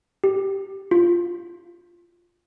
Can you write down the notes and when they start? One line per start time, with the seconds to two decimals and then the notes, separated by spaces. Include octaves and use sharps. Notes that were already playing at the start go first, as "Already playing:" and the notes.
0.24 G4
0.91 F4